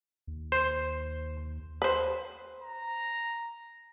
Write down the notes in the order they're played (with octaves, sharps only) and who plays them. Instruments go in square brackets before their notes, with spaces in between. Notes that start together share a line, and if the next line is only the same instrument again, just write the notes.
[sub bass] D#2
[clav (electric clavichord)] C5
[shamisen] B4 C5
[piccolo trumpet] A#5